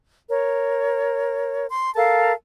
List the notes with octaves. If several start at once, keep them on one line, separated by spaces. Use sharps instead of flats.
A#4 C#5
C6
A4 A#4 F5 A5